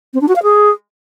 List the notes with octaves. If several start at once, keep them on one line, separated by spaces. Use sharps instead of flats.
C4
D4
F#4
F5
G#4